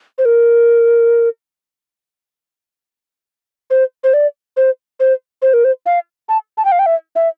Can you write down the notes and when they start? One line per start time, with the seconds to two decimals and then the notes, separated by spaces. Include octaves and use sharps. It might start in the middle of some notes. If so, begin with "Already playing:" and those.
0.18 C5
0.25 A#4
3.70 C5
4.04 C5
4.14 D5
4.57 C5
5.00 C5
5.42 C5
5.54 A#4
5.64 C5
5.86 F5
6.29 A5
6.58 A5
6.65 G5
6.72 F5
6.79 G5
6.86 E5
7.16 E5